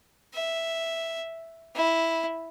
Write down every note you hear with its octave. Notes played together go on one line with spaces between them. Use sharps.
E5
E4